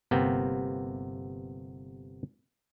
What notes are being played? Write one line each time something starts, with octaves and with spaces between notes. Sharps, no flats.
G1 C3 A#3 B3 G5